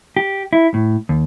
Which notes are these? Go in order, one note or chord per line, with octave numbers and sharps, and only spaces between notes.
G4
E4
A2
D#2